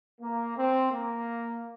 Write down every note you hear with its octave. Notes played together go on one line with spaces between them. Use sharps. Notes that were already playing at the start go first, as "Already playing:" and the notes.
A#3
C4
A#3